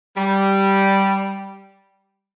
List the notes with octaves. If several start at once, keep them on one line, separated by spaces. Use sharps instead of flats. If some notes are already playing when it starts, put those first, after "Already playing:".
G3